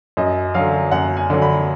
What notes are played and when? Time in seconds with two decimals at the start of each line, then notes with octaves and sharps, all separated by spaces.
0.17 F#2 D#5
0.54 D3 F#3 F5
0.91 F#2 F#5
1.17 G#5
1.30 D3 F#3
1.42 B5